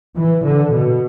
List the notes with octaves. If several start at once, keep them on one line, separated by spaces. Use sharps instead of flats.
E3
D3
B2